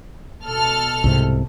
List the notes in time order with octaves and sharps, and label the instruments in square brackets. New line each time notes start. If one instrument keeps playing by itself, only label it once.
[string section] B2 A4 F6
[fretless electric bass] C2 G#2 C3